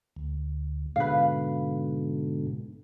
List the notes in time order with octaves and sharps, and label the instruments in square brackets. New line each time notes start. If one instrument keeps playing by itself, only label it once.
[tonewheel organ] D2
[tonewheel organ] G#2 B2 D3 [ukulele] B4 F5